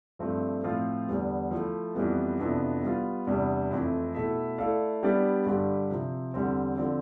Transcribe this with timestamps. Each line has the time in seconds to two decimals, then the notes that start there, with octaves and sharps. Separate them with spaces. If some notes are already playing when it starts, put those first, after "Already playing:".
0.19 G2 F3 A3 C4
0.64 A2 F3 C4 F4
1.08 E2 D3 G3 B3
1.51 F3 A3 E4
1.95 F2 E3 G3 B3
2.40 F2 C3 E3 B3 D4
2.83 G3 B3 F4
3.27 E2 C3 G3 B3 D4
3.71 F2 E3 A3 C4 E4
4.14 B2 A3 E4 A4 E5
4.58 A3 E4 A4 D5 F5
5.03 G3 B3 D4 G4 D5
5.46 G2 D3 G3 D4 G4
5.90 C3 F3 C4
6.34 E2 D3 G3 C4
6.78 D3 F3 C4